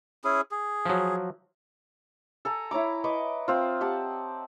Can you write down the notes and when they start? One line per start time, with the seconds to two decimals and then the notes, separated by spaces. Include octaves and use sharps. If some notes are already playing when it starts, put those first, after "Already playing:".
0.24 C#4 E4 G#4
0.51 G#4
0.85 F3 F#3
2.45 A4 G#5 A#5
2.71 E4 C#5 A#5 D6
3.04 B4 D#5 C#6 D6
3.48 C4 F4
3.81 G4 F#5 A5